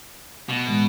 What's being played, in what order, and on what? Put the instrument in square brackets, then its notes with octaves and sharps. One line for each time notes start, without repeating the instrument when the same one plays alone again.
[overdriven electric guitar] B2
[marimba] A2 E3 G#3